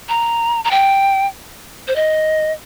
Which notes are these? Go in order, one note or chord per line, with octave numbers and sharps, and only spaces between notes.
A#5
A#5
G5
C5
D#5